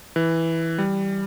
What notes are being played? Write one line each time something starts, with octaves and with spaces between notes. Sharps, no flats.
E3
G3